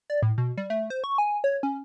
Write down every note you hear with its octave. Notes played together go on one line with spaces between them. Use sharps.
D5
A2
B2
G3
A3
C5
C#6
G#5
C#5
C#4